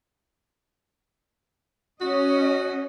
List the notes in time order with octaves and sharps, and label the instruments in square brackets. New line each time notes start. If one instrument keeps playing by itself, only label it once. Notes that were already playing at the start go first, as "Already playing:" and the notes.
[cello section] C#4 D#5 [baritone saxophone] F#4